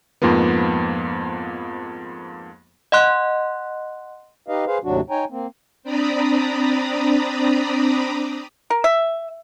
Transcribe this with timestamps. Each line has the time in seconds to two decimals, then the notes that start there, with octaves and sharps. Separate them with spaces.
0.22 F2 G#2 F3 A#3 B3
2.92 D#5 F#5 C6 F#6
4.48 D#4 G4 B4 D#5 F5
4.66 G#4 B4 C5 F5
4.84 D#2 A2 C3 F#3 D4 F#4
5.10 D#4 C#5 G5 G#5 A#5
5.30 A#3 C4
5.83 C4 D4 D5 A#5 B5 D#6
8.70 A#4
8.84 E5